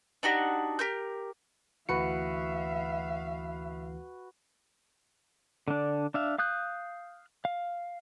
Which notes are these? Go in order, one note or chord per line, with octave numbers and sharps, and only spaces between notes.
D4 D#4 F#4 G4
G4 A#4 G6
D2 E3 F#4 B4 E5 F5 C#7
D3 D4
D4 E5 F5
F5 D#6 F#6 G6
F5